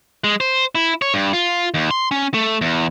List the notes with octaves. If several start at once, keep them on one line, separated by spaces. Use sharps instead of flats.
G#3
C5
E4
C#5
G2
F4
D#2
C6
C#4
A3
E2